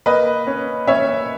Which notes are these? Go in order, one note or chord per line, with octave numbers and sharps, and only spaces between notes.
A#3 B4 D#5
C#4
C#4 C#5 E5